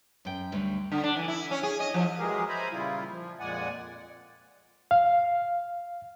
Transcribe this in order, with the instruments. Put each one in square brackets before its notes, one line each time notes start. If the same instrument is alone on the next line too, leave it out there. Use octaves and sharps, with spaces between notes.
[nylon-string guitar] F#2 G5
D2 G3
[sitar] D3
D4
E3
E4
C#4
G#4
D#5
F3
[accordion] E3 F#3 G#3 G4 G#4 A#4
C5 E5 G#5 A#5 B5
A#2 C#3 G3 E4 F4
F3
F2 A#2 G#3 D5 F#5 G#5
[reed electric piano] F5